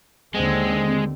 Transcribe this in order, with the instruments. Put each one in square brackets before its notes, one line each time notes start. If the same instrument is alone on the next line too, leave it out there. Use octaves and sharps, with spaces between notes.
[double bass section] D#2 D3 C4 [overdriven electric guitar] G#3